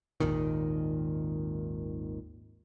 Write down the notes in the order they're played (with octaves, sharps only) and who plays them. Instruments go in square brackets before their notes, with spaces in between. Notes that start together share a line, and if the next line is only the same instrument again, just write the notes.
[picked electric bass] G#1 D#2 A#2 D#3